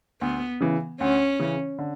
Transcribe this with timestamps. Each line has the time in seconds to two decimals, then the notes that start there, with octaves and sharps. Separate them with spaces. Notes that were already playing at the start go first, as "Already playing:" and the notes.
0.21 D2 B3
0.61 C#3 E3
1.00 D2 C#4
1.39 C#3 E3
1.79 D3